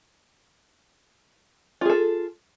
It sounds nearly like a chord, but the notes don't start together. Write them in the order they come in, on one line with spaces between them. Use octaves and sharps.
F4 G#4 A4